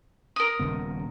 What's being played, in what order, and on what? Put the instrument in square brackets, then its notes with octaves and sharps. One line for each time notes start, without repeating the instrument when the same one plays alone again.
[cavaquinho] A#4 D#6
[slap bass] D#1 C#3 B3